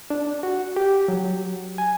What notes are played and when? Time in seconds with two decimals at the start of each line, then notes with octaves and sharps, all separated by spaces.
0.10 D4
0.43 F#4
0.76 G4
1.08 F#3
1.78 G#5